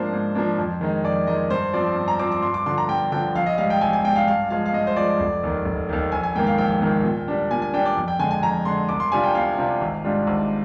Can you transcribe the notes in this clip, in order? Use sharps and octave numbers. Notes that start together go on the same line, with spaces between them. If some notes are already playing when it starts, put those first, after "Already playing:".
Already playing: G#2 F3 A#3 D4 C5
G#2
F3 A#3 D4
F2
D#3 G#3 D#4
F2 D5
D#3 G#3 D#4 D#5
G2 C5
F3 C4 D5
G2
A#5
F3 C4 D6
D6
G2 C6
D6
D3 F3 C6
A#5
G2 G5
D3 F3 G5
A#1 F5
D#5
G#2 G3 F5
G5
A#1 G#5
G#5
G#2 G3 G5
F5
G2 F5
F3 G#3 F5
F5
G2 D#5
C5
F3 G#3 D5
F1
D#2 D#3
F1
D#2 D#3
A#1 G#5
G#5
G#2 D#3 A#3 G5
F5
A#1 G5
G#2 D#3 A#3
A#2
G3 D4
A#2 G#5
G#5
G3 D4 G5
D5
F2
G5
D3 G#3 G#5
G#5
F2 A#5
D3 G#3 C6
C2 D6
C6
C3 G3 D4 F4 G#5
G5
C2 F5
C3 G3 D4 F4
G#1
G#2 G3 D4 F4
G#1